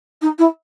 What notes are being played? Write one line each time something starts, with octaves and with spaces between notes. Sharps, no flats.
D#4
E4